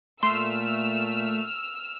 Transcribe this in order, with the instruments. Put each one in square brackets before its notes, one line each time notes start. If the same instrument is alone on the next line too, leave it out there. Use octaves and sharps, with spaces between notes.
[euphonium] A#2 [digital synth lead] A3 [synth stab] C6 [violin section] E6 F6